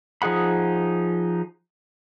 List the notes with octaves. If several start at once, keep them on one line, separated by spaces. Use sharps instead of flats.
F3 D#4 G#4 F#5 B5